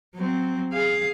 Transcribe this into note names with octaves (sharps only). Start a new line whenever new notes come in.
F#3 C4
G#4 F5